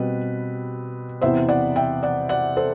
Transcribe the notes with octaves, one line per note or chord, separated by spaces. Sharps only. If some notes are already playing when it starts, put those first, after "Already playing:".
Already playing: B2 G3 C4 B4
E2 C3 E3 B3 C5 E5
D5 F#5
E5 G5
D5 F#5
D5 F#5
A4 C5